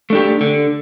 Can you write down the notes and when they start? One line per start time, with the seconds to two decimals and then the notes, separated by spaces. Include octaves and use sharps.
0.10 A3 D4 G4
0.41 D3